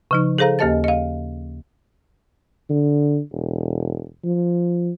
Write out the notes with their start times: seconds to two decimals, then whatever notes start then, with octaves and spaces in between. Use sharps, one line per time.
0.11 C#3 F3 D#4
0.38 G#4 A4 C5 F5 A#5
0.59 D#2 A#3 G4 D#5 A5 A6
0.84 D#5 F5
2.70 D3
3.32 E1
4.24 F3